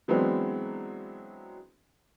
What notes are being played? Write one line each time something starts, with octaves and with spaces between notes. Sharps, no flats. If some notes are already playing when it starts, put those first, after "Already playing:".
E3 F#3 G#3 B3 C4 D4